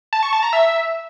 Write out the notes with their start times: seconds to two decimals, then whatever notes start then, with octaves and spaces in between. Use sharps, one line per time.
0.13 A5
0.23 C#6
0.33 A5
0.43 A#5
0.53 E5